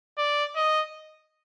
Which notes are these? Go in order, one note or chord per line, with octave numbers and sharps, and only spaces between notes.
D5
D#5